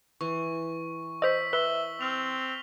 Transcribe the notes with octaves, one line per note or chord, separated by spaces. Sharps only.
E3 C#6
C5 D#5 E6 B6
B4 E5 G7
C4 F6 F7